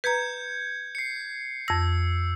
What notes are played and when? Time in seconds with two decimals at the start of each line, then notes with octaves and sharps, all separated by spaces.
0.04 B4 A#5 G6 G#6 C#7
0.95 C7 C#7
1.68 F2 E6 A#6